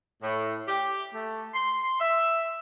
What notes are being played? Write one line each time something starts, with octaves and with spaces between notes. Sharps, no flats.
A2
G4
A3
C6
E5